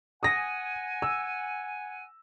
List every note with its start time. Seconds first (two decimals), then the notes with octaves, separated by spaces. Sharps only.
0.23 F#5 G#5 D#6 A#6
1.02 E6